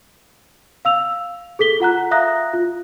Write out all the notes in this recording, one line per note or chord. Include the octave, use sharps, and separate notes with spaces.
F5 E6 F7
G#4 A4 B6 G7
F4 F#5 A#5 F#6
E5 F5 A#5 D#6 F#6 A#6
F4